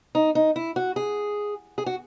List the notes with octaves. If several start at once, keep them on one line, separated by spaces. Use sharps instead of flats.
D#4
D#4
E4
F#4
G#4
G#4
F#4